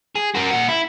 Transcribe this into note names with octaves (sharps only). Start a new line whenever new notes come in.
G#4
F#4 A#4
A#2 F#5
E4